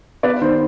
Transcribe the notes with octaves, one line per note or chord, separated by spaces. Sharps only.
B3 B4 D5
D#3 C5